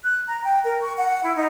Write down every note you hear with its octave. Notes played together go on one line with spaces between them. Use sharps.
F#6
A#5
G5
A#4
C#6
F#5
E4
D#4